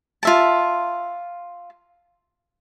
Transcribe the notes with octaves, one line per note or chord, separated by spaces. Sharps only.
F4 E5 A5